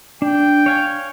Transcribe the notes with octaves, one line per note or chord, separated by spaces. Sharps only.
D4 G5
C#5 F5 G#5